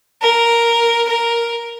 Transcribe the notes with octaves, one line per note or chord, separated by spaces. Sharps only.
A#4
A#4